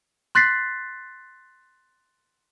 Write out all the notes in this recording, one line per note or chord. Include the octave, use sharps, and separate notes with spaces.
C6 F#6 A6 B6 C7